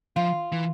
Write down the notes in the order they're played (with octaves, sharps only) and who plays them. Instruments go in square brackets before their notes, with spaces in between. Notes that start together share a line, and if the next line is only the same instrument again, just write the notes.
[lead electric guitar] F3 [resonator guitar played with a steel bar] F4
[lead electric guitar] E3